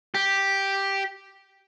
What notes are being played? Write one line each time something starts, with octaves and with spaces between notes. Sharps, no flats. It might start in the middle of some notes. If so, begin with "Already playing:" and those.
G4